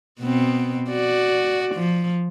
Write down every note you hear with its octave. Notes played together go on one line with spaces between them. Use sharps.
B2 B3 C4
F#4 D5
F3